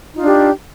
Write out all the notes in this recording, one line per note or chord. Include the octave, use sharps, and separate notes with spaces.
D4 D#4 F4 G4